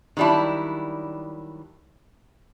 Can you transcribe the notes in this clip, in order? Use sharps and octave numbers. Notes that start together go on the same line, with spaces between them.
D#3 F#3 G3 D4 E4